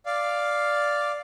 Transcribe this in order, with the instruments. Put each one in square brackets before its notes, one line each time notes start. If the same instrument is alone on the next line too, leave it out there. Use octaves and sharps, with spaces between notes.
[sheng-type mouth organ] D5 F5